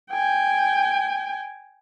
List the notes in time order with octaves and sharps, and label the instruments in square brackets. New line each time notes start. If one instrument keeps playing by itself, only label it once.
[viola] G5 G#5